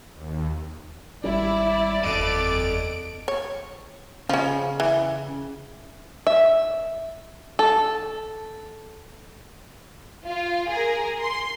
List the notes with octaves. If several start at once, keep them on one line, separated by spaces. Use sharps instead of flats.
D#2
G#1 G3 C#4 E4 D5
F#1 E2 A4 D#5 D7
C#5
C#3 F3 C#4
E3
E5
A4
F4
G#4 A#4
C6